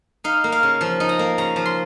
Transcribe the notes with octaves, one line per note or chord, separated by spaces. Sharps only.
D#4 F5
A#3
F5
C#3
F3
D#4
A#5
A#3
C#3 A#5
F3
C6